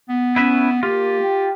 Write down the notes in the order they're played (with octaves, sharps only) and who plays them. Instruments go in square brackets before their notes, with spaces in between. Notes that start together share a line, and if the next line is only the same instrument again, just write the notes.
[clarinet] B3
[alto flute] C#4 [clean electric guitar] E4 B4 E5
[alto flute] A#3 [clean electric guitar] F4 [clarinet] G4
[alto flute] G5